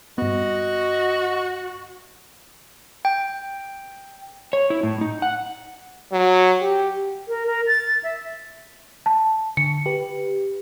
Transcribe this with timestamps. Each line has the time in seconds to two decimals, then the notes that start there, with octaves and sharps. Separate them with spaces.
0.18 G2 B3 F#4 D#5
3.05 G5
4.53 C#5
4.70 E4
4.83 A2
5.01 D#4
5.22 F#5
6.12 F#3
6.61 G4
7.28 A#4
7.47 A#4
7.67 A6
8.03 E5
9.06 A5
9.57 D3 C#7
9.86 G4 B4